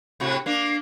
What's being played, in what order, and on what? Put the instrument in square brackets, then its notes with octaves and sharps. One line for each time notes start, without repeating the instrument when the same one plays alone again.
[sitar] A2 C3 F#4
A#3 D4